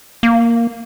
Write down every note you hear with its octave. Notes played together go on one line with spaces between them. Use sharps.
A#3